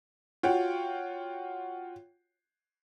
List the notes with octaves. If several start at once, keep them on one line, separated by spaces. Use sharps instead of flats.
F4 F#4 C#5 G5